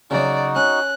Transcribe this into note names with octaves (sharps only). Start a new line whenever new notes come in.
C#3 F#3 D#4 F#4 D5
C#4 F#6